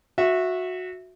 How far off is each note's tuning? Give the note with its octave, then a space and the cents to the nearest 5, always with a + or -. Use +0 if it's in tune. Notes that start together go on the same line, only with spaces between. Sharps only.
F#4 -15 E5 +0